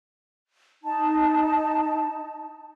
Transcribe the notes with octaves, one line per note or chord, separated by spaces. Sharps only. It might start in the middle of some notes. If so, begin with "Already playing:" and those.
D#4 A5